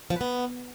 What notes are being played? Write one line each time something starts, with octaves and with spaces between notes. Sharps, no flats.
F3
B4
B3